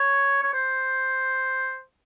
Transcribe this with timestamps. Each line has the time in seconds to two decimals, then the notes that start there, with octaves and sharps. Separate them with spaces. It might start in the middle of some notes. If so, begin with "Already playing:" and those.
Already playing: C#5
0.43 C#5
0.54 C5